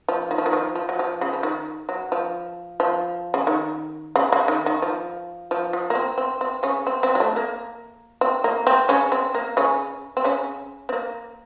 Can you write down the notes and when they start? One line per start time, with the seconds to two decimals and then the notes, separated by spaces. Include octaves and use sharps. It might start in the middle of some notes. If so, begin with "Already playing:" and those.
0.09 F3
0.31 D#3
0.38 F3
0.46 D#3
0.53 F3
0.76 F3
0.89 F#3
0.99 F3
1.21 C#3
1.33 F3
1.43 D#3
1.89 F#3
2.12 F3
2.80 F3
3.34 C#3
3.47 D#3
4.16 C#3
4.32 C#3
4.48 D#3
4.66 D#3
4.82 F3
5.51 F3
5.73 F3
5.90 A#3
5.95 C4
6.18 C4
6.41 C4
6.63 C#3 C#4
6.87 C4
7.03 C4
7.15 F#3
7.20 A3
7.36 A#3
8.21 C4
8.44 A#3
8.67 C4
8.89 C#3 C#4
9.12 C4
9.35 A#3
9.57 C#3 C#4
10.17 C4
10.24 C#3 C#4
10.89 C4
10.93 A#3